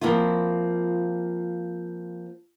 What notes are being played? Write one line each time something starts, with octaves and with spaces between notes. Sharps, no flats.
F3 G3 A#3 C4 E4 F4